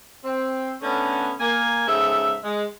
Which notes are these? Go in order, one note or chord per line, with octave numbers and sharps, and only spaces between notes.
C4
D3 A3 B3 C#4
A#3 G#5
G#2 C#3 G#3 A4 E5
G#3